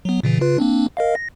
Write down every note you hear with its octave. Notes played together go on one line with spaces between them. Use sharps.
F#3 B3
A#2 C#3 E3
C#3 F4 B4
A#3 C4 D4
A#4 D#5 F5
A#6